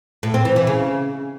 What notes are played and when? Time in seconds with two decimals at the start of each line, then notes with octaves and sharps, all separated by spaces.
0.23 A2
0.34 C4
0.45 E3
0.56 E3
0.67 C#3